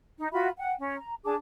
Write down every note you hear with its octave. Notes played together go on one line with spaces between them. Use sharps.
D#4
F4 F#4 E5 B5
F#5 G5
C#4
A#5
D4 G#4 A5 D6